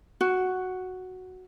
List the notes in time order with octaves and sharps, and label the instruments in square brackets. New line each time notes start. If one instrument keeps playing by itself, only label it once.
[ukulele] F#4